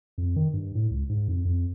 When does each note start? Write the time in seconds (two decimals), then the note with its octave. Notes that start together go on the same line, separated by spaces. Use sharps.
0.18 F2
0.36 D#3
0.54 G2
0.75 A2
0.91 C#2
1.10 G#2
1.28 F2
1.45 F2